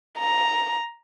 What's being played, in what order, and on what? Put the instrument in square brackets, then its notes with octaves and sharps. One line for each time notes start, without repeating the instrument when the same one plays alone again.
[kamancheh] A#5